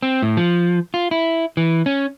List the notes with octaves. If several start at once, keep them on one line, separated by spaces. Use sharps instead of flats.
C4
A2
F3
F4
E4
E3
C#4